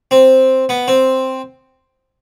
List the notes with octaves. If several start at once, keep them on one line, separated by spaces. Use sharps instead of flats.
C4
B3
C4